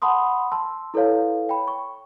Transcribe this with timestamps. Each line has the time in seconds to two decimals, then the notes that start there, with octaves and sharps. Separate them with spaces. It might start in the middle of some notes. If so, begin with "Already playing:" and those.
0.02 F#5 A5 B5 C6 D#6
0.52 A5 C6 E6
0.94 E4 A4 B4 C#5 F5
1.49 G5 B5
1.68 C#6